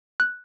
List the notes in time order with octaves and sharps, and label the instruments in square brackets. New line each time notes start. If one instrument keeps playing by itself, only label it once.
[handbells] F#6